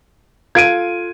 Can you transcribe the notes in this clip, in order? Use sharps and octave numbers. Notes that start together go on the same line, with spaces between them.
F4 A4 F5 G#6 D7 D#7